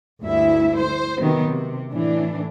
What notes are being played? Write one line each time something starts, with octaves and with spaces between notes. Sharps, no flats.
D2 G2 E4 E5
C5
C3 D#3 F#3 B3
C3
A2 E3 D4